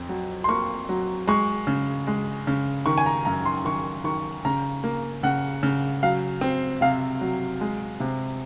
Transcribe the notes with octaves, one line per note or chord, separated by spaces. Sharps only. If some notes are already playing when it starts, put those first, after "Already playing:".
Already playing: F2
F#3
C6
A#3 C#6
F#3
G#3 C#6
C#3
G#3
C#3
D#3 C#6
G#5
A#5
F#2 A#5
C6
D#3 C#6
D#3 C#6
C#3 A#5
A#3
C#3 F#5
C#3
F#3 F5
C4
C3 F5
F#3
G#3
C3